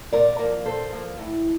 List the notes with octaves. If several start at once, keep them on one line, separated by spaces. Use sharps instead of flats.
A#2 A#4 D5
F3 A#3
A#2 A4 C5
F3 A#3
A2